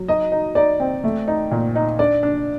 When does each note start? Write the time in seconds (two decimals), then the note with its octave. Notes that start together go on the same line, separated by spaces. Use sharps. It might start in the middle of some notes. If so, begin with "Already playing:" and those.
Already playing: F#3
0.08 D#4 D#5
0.32 D#4
0.55 D#4 D5
0.80 C4
1.04 A3
1.28 D#4
1.51 A#2
1.75 D#4
1.99 D4 D5
2.23 D4